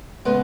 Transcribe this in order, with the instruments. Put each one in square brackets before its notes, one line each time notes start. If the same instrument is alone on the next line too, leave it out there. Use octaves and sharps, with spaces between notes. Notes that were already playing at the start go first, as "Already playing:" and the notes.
[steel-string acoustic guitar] C#3 G#3 B3